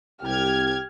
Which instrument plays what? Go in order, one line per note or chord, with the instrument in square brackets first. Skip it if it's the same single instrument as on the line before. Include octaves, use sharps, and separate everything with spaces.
[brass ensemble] C2 [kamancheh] G4 [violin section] F6 G#6